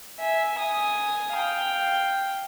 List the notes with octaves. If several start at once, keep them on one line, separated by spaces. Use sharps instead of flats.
E5 G#5
G#5 D#6
F5 G5